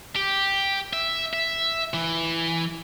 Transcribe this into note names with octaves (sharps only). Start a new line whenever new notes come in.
G4
E5
E5
E3